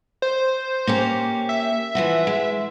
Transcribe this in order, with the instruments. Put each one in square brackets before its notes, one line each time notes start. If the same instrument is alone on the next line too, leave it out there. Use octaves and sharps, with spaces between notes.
[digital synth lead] C5
[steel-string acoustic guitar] A#3 C#4 G4
[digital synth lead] E5
[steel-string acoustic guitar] E3 F3 F#4
G#3